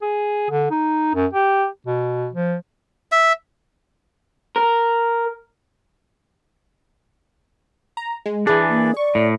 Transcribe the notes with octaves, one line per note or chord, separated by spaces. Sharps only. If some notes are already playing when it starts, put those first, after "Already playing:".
G#4
D3
D#4
F#2
G4
B2
F3
E5
A#4
A#5
G#3
E3 D4 G#4
A#3
D5 C#6
A2